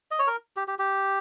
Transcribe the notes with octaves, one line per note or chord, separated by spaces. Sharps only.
D#5
C#5
A#4
G4
G4
G4